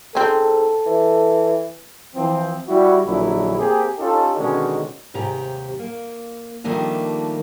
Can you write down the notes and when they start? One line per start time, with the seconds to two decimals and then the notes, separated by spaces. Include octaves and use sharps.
0.15 G#2 C4 C#4 A4
0.86 E3
2.14 E3 F3 C4
2.67 G3 E4 F#4
3.05 A#1 A#2 D3 F#3 D#4 E4
3.57 A#3 C4 G4 G#4
3.98 C#4 D#4 F4 G4 A4
4.36 B2 D3 D#3 G#3 C#4
5.14 D#2 G#2 C3 G4 A#5
5.79 A#3
6.64 D#3 F3 G3 A3 A#3 D4